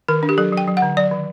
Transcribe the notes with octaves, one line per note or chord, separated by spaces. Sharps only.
D#3 A#4
D4
G4
F#3 A4
F#3 G5
F#3
F#5
D3
F#3 D5
D#3